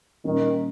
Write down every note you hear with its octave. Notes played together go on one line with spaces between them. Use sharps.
A#2 D#3 G3 C#4